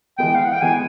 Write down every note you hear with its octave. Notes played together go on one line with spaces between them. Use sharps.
E3 G#3 B3 G5
F5
F#5
G5
E3 G#3 B3 G#5